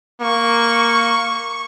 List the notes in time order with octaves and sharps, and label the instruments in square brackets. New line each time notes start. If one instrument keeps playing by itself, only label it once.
[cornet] A#3 [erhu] C#6